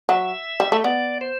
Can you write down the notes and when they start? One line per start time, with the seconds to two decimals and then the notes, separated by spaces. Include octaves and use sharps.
0.09 F#3 E5
0.60 G3
0.72 A3
0.84 B3 D5
1.21 C5